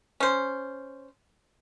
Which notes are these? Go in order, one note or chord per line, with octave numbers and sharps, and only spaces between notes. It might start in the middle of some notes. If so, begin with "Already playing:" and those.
C#4 C5